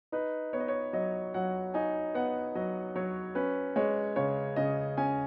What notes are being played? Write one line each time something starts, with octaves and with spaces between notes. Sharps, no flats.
D#4 B4
B3 C#5
D#5
C#5
F#3 D#5
F#3 F#5
D#4 G#5
B3 F#5
F#3 D#5
F#3 C#5
C#4 B4
G#3 C#5
C#3 C#5
C#3 D#5
C#4 G#5